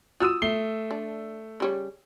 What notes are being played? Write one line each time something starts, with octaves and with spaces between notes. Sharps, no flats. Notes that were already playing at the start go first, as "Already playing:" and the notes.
F4 F#4 D#6 E6 D#7
A3 C7 G7
D4
C#3 G3 C#5